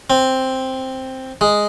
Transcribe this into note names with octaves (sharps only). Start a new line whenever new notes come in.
C4
G#3